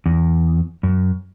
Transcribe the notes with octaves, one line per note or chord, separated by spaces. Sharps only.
E2
F#2